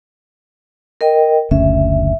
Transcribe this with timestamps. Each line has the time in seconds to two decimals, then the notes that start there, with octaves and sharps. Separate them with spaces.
1.01 A#4 D#5 G5
1.51 F#1 D2 C#4 E5